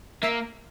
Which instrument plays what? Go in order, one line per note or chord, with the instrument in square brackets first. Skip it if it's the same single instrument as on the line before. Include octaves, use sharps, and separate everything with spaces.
[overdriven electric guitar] A#3 [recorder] E5